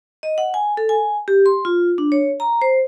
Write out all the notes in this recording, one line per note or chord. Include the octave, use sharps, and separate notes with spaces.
D#5
F#5
G#5
A4
G#5
G4
C6
F4
D4
C#5
A#5
C5